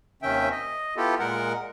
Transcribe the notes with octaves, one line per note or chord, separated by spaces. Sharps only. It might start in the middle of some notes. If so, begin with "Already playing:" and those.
D#2 C3 D#3 C#4 E5 G5
D#5
B3 E4 F4 G4 A4
A#2 G#3 A#4 F#5